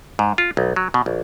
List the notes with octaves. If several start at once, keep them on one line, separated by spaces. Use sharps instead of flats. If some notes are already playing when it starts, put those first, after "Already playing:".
G#2
F4
B1
F#3
B2
A#1